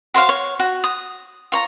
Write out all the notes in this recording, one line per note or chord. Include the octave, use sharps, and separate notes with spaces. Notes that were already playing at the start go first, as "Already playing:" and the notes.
F#4 C5 C#5 F5
C#5
F#4
D#6
F4 C#5 A#5